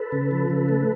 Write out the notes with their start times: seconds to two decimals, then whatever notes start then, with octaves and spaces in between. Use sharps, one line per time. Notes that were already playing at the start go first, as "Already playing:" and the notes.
Already playing: A4 B4
0.12 C#3
0.31 F3
0.50 C#3
0.68 A3